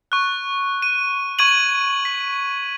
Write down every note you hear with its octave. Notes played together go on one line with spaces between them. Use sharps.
C#6 F#6
D#7
C#6 G#6 D#7 F#7
B6